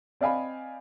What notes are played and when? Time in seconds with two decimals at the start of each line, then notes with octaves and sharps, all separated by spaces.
0.21 C4 D5 D#5 F5 G#5 B5